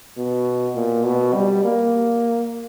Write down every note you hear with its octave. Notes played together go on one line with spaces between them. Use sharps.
B2
A#2
B2
G3
A#3